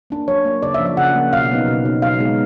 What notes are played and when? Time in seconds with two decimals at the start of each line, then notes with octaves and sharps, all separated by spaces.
0.10 A#3 D4
0.28 F#3 C#5
0.45 A#3 D4
0.62 C#3 D5
0.74 E5
0.80 F3 A#3 D4
0.86 E5
0.97 C#3 F#5
1.15 F3 A#3 D4
1.33 B2 F5
1.50 F#3 B3 D#4
1.68 B2
1.85 F#3 B3 D#4
2.02 B2 F5
2.20 G#3 B3 D#4